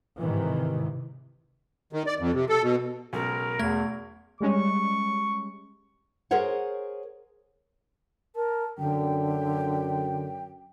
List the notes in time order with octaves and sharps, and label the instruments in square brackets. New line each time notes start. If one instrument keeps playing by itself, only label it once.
[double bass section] G#2 C3 D#3 E3
[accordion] D#3
D5
F2
C3
A4
B2
[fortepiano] B1 C#3 G#3 [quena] A#4
[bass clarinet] E2 [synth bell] A3 G#6
[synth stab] G3 G#3 C#4 [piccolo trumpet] C#6
[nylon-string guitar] G#4 A#4 C5 C#5 F#5
[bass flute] A#4 [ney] A5
[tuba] F#2 [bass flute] D3 [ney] G5